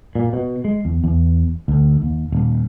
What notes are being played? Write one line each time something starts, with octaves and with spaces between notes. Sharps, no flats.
A#2
B2
G#3
E2
E2
D2
D#2
D#1